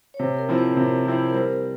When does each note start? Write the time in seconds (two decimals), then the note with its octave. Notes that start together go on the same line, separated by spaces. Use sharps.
0.14 C#5
0.19 C3 C5
0.39 A#4
0.49 F3 C4 E4
0.58 C5
0.77 C3
1.05 F3 C4 E4
1.30 A#4
1.34 G3 C5